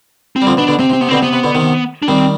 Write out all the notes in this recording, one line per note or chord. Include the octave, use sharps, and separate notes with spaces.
C4
G3
D3 F3
B2 D4
B2 D3
C3 C4
C3
C4
C3 B3
B2 D3 C4
C3 B3
C3
B2 D3
C3 D#3
D4
D#3 G3 C4